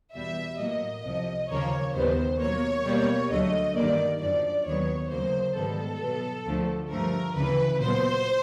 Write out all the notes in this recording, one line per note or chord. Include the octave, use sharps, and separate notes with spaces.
E2 B2 G3 E5
A2 F#3 A#3 D#5
C2 C3 F3
D#2 C#3 F3 A#3 C#5
D#2 D#3 G3 B3 C5
B2 F#3 A#3 C#5
B2 G3 A#3
D2 D3 F#3 A3 D#5
G2 D#3 G3 A#3 D5
F#2 D3 F3 D5
D#2 D#3 F#3 B3 C#5
D2 C#3 F#3 A#3 C5
G#2 D#3 G3 B3 A4
B2 F#3 B3
D2 D3 F3 A3
G2 D3 F3 A3 A#4
D2 C#3 E3 B4
A#2 F#3 B3 C5